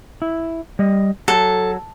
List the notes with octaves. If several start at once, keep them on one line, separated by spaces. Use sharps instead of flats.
E4
G3 D#5
F#3 A4